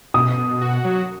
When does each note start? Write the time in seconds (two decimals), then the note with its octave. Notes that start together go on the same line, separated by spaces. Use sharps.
0.14 B2 D#6
0.38 B2
0.61 F#4
0.85 F#3